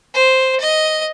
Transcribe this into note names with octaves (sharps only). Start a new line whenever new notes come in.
C5
D#5